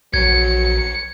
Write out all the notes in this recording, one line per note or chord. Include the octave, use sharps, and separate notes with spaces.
A#1 F#3 G#6 C#7